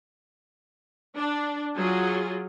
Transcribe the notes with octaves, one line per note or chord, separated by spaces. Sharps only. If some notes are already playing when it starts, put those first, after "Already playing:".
D4
F#3 F4 G#4